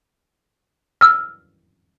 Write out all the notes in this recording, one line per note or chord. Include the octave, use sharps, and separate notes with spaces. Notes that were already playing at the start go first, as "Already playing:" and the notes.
E6 F6